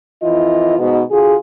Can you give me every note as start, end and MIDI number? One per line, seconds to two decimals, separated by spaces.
0.23 0.76 41
0.23 0.76 52
0.23 0.76 64
0.23 0.76 65
0.23 0.76 75
0.78 1.02 44
0.78 1.02 47
1.11 1.36 50
1.11 1.36 65
1.11 1.36 66
1.11 1.36 68